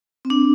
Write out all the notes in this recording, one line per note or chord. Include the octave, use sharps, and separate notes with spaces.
C4
D4